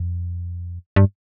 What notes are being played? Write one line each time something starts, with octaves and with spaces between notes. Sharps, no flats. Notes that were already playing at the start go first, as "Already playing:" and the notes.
Already playing: F2
G2